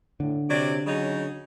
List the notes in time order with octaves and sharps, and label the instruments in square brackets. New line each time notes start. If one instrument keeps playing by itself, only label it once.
[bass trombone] A2 [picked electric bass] D3
[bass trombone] C3 [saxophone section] F#3 D5
[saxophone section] C#3 D#4 [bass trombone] F#3